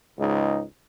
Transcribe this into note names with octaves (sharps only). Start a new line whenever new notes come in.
C#2 G#2 D#4